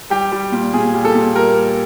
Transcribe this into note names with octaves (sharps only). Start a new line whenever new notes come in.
G3 G4
G3
A#2
A#2 G#4
G3
A4
A#2
G3 A#4